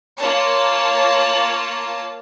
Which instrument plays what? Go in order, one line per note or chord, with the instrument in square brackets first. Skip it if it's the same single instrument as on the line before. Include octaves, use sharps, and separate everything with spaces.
[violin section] A#3 F4 C#5 A5